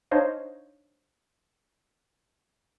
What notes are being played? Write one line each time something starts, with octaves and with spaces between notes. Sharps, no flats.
D4 D#4 C5 C#5 D#5 F5